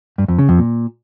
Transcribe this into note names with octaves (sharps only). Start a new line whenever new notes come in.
G2
F2
C#3
F2
A#2